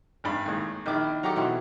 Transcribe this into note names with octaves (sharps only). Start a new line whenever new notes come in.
G#1 G2 B5
D#2 A2 G#3
A#1 D#3 E4 D6
F#3 G4 A4 A#5 D6
B2 E3 C4